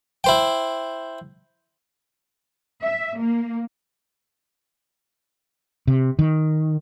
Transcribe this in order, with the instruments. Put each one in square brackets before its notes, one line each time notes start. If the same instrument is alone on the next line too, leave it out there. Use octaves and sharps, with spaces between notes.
[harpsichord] E4 C5 G5
[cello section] E5
A#3
[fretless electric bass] C3
D#3